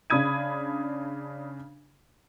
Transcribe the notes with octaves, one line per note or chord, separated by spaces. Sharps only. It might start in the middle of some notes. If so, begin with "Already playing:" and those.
C#3 D4 B5 D#6 G#6 D#7